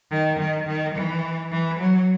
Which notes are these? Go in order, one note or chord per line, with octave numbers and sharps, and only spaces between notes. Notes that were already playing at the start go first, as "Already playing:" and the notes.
D#3
D#3
D#3
E3
E3
F#3